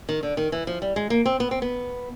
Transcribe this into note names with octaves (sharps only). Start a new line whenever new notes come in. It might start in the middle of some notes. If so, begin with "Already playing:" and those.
D#3
D3
D#3
E3
F3
G3
G#3
A#3
C4
B3
C4
B3